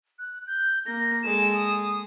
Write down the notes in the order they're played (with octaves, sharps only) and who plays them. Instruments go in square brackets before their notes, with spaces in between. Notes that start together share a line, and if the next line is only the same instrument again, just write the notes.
[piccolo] F#6
G6
[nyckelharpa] A#3 [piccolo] A#6
[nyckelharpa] G#3 A4 [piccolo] E7
[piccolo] D#6